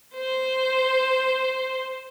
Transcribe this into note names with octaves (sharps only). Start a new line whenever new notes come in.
C5